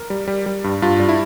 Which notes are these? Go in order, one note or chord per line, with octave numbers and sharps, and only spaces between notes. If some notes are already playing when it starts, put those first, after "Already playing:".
Already playing: A#4
G3
G3
G3
G2
G2 F4
G3
E4